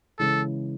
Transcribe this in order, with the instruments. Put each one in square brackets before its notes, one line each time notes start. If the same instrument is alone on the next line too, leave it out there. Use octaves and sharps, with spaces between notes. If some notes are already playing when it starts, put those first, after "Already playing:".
[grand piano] C#3 E3 G#3 [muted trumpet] A4